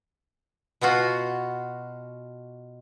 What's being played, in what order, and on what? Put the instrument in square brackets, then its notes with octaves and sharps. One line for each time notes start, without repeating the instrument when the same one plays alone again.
[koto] B2 B3 F4 F#4